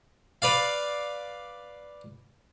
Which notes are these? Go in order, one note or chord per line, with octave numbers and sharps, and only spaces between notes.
B4 D5 F5